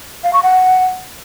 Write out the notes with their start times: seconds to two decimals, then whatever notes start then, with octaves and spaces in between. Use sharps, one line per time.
0.24 F5
0.33 C#6
0.43 F#5